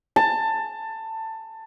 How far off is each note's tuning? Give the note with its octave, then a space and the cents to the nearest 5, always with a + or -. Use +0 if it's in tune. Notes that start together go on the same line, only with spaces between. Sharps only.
A5 +20